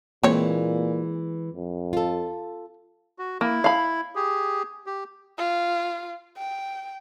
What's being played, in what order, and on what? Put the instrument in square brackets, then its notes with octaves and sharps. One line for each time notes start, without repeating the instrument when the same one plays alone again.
[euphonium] A#2 [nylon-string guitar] E3 G#3 [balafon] A#3 [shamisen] C4 C#5
[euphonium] F2
[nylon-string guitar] F4 A4
[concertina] F#4
[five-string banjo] A#3 [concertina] E4
[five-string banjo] F5 B5
[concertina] G4 G#4
G4
[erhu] F4
G5